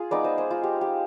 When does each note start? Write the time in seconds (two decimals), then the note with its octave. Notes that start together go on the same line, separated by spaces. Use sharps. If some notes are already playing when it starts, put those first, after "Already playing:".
Already playing: F4 G#4
0.11 G#3 B3 D#4 B4 D5
0.24 C5 D#5
0.38 G#4 C5
0.51 F4
0.64 G4
0.81 G4